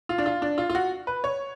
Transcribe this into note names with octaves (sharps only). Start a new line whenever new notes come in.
F4
D4
F4
D4
F4
F4
F#4
B4
C#5